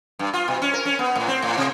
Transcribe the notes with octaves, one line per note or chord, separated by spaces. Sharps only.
G2
F4
B2
C#4
A#4
C#4
B3
A2
C4
A2
C3